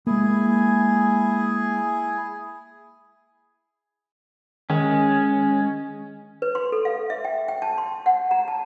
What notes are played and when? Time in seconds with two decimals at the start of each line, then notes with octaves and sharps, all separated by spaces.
0.07 G#3 A#3 E4 G#4 G#5
4.70 D#3 G#3 C#4
6.42 B4
6.55 C6
6.72 A4
6.85 F5
7.10 E5
7.25 G5
7.48 G5
7.62 A5
7.78 C6
8.06 F#5
8.31 A#5
8.48 A5